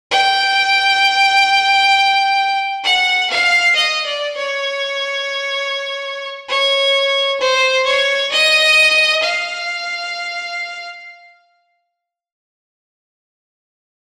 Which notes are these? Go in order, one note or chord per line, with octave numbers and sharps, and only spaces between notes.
G5
F#5
F5
D#5
D5
C#5
C#5
C5
C#5
D#5
F5